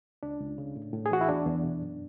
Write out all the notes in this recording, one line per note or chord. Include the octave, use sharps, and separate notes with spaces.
C#2 D4
C#2
C#3
A2
A2
G#4
E3 F#4
E4
E2 D4
E2
B2
F#2